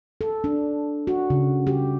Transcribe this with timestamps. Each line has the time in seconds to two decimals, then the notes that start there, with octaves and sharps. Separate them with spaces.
0.21 A4
0.44 D4
1.07 F#4
1.30 C#3
1.67 G4